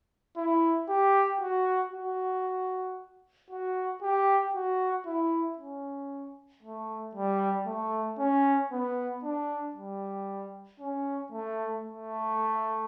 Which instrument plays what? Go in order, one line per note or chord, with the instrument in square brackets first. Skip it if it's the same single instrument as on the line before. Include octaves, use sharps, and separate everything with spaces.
[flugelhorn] E4
G4
F#4
F#4
F#4
G4
F#4
E4
C#4
A3
G3
A3
C#4
B3
D4
G3
C#4
A3
A3